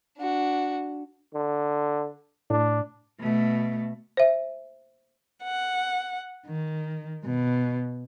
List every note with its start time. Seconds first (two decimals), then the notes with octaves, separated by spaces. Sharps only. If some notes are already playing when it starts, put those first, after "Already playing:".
0.17 D4 F#4
1.34 D3
2.50 A2 D4
3.20 B2 A3
4.17 C5 E5
5.42 F#5
6.48 D#3
7.26 B2